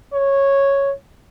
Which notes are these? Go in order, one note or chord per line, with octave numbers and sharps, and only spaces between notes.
C#5